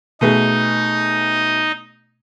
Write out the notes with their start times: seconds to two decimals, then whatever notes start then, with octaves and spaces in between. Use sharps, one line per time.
0.21 B2 A3 D#4 G#4 D#5